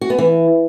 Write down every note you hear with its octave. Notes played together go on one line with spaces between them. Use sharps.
F#4
B3
E3